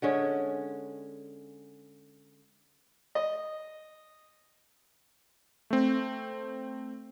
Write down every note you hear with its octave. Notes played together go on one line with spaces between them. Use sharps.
D3 G#3 C#4
D#5
A3 C4